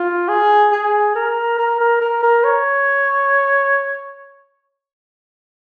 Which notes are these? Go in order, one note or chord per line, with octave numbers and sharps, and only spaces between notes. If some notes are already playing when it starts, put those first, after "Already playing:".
Already playing: F4
G#4
G#4
A#4
A#4
A#4
A#4
A#4
C#5